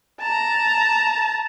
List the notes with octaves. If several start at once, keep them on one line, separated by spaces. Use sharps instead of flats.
A5 A#5